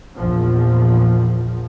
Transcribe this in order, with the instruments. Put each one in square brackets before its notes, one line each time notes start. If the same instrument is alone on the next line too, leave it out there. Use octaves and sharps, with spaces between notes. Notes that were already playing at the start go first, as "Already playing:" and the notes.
[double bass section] A#1 E2 F3